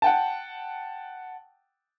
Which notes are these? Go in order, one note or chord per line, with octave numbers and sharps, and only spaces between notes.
F#5 G5 A5